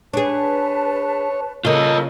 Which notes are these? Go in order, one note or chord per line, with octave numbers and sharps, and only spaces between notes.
D4 G#4 B4 C#5 A5
C#3 A#3 F4 A4 A#4 D#5